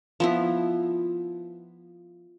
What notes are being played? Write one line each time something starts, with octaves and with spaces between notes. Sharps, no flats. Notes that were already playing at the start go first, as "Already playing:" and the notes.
F3 B3 E4